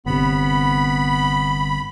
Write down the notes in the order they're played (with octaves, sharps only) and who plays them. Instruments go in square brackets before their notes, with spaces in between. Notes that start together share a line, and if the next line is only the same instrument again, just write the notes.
[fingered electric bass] G1 C3 [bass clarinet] B3 [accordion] B5